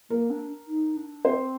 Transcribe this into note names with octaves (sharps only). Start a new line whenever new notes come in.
A#3 A#4
D4
D#4
D4
C4 C5